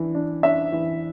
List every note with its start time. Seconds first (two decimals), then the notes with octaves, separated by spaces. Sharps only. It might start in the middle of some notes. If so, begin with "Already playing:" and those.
Already playing: E3 D4
0.15 D4
0.43 D4 E5
0.72 E3